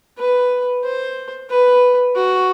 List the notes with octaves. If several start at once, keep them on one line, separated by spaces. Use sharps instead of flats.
B4
C5
B4
F#4